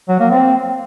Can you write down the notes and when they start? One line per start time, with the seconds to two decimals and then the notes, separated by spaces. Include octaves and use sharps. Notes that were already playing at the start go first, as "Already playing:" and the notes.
0.08 F#3
0.20 A#3
0.31 C4